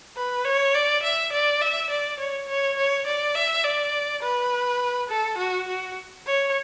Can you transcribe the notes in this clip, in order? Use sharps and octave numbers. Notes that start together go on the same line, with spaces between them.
B4
C#5
D5
E5
D5
E5
D5
C#5
C#5
C#5
D5
E5
D5
B4
A4
F#4
F#4
C#5